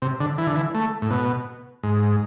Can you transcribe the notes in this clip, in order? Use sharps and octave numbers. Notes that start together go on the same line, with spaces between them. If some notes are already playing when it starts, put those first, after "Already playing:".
C3
D3
E3
D3
E3
A3
A2
B2
G#2